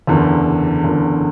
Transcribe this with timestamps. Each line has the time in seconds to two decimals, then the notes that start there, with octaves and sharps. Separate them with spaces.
0.07 F#1 E2 D3
0.84 F#1 E2 D3